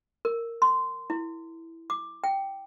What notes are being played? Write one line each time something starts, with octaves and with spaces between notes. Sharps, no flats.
A#4
C6
E4
D6
G5